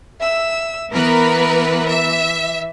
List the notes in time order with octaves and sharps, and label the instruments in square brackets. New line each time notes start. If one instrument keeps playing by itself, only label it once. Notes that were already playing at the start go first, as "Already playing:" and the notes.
[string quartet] E5 E6
[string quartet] E3 [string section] B3 A#4 B4
[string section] E5